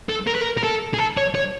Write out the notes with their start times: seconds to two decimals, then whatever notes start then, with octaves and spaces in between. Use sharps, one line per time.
0.09 A4
0.27 A#4
0.35 B4
0.41 A#4
0.57 A#4
0.63 A4
0.94 G#4
0.99 A4
1.17 C#5
1.35 C#5